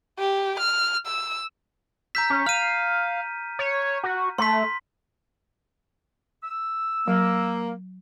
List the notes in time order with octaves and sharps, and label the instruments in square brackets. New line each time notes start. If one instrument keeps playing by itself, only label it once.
[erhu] G4
F6
E6
[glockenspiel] A#5 G6 B6 [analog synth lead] E6
[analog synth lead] C#4
[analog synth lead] F5 [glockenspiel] F6 D#7
[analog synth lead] C#5
F#4
[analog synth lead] A3 [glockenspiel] C6 B6
[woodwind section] E6
[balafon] F#3 [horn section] A#3